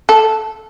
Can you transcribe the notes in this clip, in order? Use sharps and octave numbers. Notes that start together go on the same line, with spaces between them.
A4